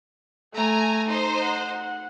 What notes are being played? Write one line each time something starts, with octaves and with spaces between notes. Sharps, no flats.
A3 G#5 A#5
D#4 C5
F#5